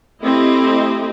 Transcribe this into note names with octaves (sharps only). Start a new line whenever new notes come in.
A3 C4 E4 G4 D#5